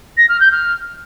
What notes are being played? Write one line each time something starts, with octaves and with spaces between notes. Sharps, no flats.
A#6
F6
G6
F6